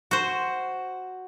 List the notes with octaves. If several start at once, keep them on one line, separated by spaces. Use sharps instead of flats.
F#4 C5